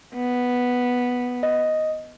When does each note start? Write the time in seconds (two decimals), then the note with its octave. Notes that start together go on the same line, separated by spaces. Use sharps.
0.15 B3
1.43 D#5